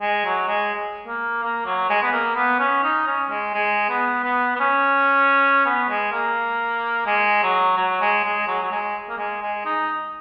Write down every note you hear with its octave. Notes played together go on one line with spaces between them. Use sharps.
G#3
F#3
G#3
A#3
A#3
F#3
G#3
B3
A#3
B3
C#4
D#4
C#4
G#3
G#3
B3
B3
B3
C#4
B3
G#3
A#3
G#3
F#3
F#3
G#3
G#3
F#3
F#3
G#3
A#3
G#3
G#3
D#4